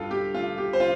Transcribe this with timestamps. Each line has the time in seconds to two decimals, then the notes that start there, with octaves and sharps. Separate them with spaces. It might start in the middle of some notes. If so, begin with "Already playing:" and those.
Already playing: G2 F4 A4
0.11 G4
0.34 A3 F4
0.58 G4
0.73 C5
0.80 F4